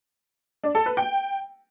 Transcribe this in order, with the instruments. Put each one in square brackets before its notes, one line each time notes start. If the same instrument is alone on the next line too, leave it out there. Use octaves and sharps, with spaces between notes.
[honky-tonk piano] D4
A4
B4
G5